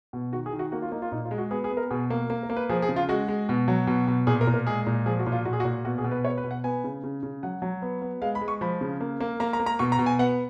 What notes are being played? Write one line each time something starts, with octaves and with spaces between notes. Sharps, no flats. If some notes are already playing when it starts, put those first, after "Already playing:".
B2
D#3 F#4
G#4
D#3
F#4
A#3 F#4
F4
A#3 D#4
F4
A#2 D#4
F4
G#3
F#4
B3 G#4
G#4
B3
A#4
B2 G#4
A#3
A#3
A#4
A#3
B4
F3 G#4
G#4
C#3
F4
G#3 F#4
G#3
B2
F#3
B2
B2
A#2 G#4
A#4
A#2
A#4
G#3 G#4
A#2
F3 G#4
F#4
A#2
F4
A#2 F#4
G#4
F#4
A#2
B2 F#4
G#4
B2
B4
B3 C#5
B4
B2
F#5
B3 G#5
C#3
C#3
C#3
F#3 F#5
F#3
B3
B3
G#3 F5
B5
G#3
C#6
F3 B5
C#3
A#3
A#3
A#3 A#5
A#5
A#3
A#5
B2 C#6
A#5
B2
G#5
B3 F#5